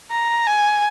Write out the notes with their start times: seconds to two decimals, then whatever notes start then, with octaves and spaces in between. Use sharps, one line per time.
0.11 A#5
0.46 G#5